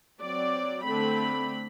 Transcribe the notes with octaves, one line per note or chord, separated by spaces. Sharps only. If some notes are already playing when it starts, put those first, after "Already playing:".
F#3 C4 D5
D3 A3 C4 B5